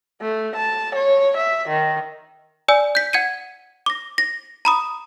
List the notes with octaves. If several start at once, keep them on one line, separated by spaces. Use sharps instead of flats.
A3
A5
C#5
E5
D#3
D5 G#5 E6
G6 B6
F#5 G#6 C#7 D#7
D6 A#6
A#6
A#5 B5 D#6